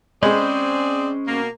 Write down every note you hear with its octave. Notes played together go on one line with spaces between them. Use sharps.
G#3 C4 C#4 G#4 C5 D5 B5
B2 A#3